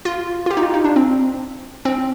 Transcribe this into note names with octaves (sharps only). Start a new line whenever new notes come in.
F4
F4
G4
D#4
F4
D#4
D4
C4
C4